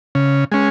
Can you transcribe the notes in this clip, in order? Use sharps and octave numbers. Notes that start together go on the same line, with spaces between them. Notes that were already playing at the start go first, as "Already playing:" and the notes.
C#3
G#3 C#4